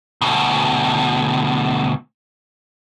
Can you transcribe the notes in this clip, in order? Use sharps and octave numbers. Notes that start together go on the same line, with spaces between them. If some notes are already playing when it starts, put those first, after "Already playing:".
D2 B2